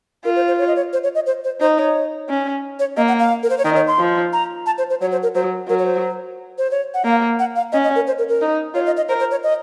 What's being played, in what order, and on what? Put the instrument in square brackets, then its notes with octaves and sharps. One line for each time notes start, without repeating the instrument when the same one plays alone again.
[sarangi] F4 [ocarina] A#4
[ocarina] C5
C5
C#5
D#5
C#5
C5
C#5
D#5
C5
C5
[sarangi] D#4 [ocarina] C5
[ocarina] C#5
[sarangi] C#4
[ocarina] C#5
[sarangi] A#3 [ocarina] D#5
[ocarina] F#5
F5
A#4
C5
C#5
[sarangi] D#3 [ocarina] D#5
[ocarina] C#5
C6
[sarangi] F3
[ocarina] A#5
A5
C5
C5
[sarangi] F#3 [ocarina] C#5
[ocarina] C5
A#4
[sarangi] F#3 [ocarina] C5
[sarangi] F#3 [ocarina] A#4
[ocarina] C#5
C5
C5
C#5
F#5
[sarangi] A#3 [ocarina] F5
[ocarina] F#5
F5
[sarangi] C#4 [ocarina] D#5
[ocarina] D#5
A#4
C5
A#4
A#4
[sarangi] D#4
[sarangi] F4 [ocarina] C#5
[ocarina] D#5
D#5
[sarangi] A#4 [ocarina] C5
[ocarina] C5
C#5
D#5